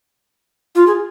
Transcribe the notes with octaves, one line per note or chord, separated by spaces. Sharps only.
F4
G#4